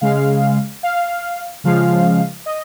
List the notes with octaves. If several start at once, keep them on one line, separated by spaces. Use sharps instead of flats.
C#3 G#3 F5
F5
C#3 F3 G#3 F5
D#5